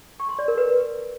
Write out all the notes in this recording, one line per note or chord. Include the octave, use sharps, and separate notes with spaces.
C#6
C6
D5
A#4
B4